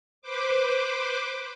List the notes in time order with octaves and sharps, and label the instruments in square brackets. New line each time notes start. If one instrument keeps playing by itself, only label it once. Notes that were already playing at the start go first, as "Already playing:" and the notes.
[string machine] B4 C5 D6